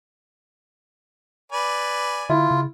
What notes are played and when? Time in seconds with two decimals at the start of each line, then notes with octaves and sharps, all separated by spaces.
1.52 B4 D5 G#5
2.29 D3 E4 F4
2.51 C#3